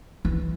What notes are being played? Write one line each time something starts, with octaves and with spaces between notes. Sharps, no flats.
E3